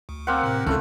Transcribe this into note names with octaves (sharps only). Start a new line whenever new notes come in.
D2
A#3 C4 F#5
A2 C3
C#2 A3 C#4 E4 A4